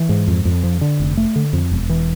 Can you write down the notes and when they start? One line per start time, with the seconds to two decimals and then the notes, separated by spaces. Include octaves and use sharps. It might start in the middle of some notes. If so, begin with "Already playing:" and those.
Already playing: E3
0.09 G#2
0.28 F2
0.45 F2
0.63 F3
0.81 D3
1.00 F1
1.17 A3
1.36 D3
1.53 F2
1.71 E1
1.89 E3